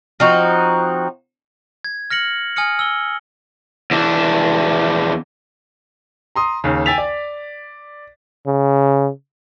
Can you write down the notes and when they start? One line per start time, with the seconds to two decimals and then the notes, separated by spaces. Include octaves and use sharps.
0.20 F3 C4 D#4 F#4
1.84 G#6
2.10 F6 A#6 C#7 F#7
2.56 G#5 D#6 F6 C#7
2.79 E6 G7
3.91 E2 D4
6.36 A#5 C6 D#6
6.64 D#2 C#3
6.86 G5 G#5 E6 A6 B6 F7
6.98 D5
8.47 C#3